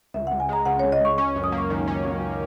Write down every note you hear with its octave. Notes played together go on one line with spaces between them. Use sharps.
C#2 E5
F#5
C#2
G#5
G#3 A#5
C#3 F#5
C#2 C#5
D#5
C#2 C#6
C#4 C#6
F#2
D#6
A#3
C#6
D#3
C#4
F#2